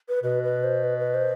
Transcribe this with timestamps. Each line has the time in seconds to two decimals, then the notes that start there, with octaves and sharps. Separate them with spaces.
0.09 B4
0.23 B2 B4
0.44 B4
0.64 C5
0.84 B4
0.99 B4
1.14 C5